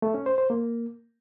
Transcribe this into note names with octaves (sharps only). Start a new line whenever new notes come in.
A3
C#4
C5
C5
A#3